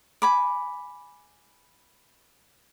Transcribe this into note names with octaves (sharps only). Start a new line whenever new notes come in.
G#5 B5 D6